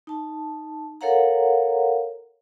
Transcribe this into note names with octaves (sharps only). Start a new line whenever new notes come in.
D#4 A5
A4 A#4 C#5 F5 F#5 A#5